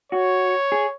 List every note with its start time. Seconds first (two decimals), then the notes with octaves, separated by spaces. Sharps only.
0.12 F#4 C#5
0.72 G#4